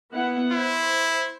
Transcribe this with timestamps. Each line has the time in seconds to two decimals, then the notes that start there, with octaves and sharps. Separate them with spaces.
0.12 B3 E4 F#5
0.53 E4 C5